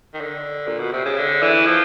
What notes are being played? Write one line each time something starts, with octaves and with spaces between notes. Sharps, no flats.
D#3
D3
A#2
B2
C3
C#3
D3
E3
F3